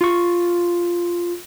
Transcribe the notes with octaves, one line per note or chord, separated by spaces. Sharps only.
F4 C#6